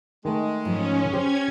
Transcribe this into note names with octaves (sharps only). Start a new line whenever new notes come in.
D#3 G#3 A3
G#2 F3 C#4
C#4 G4 C5 G#6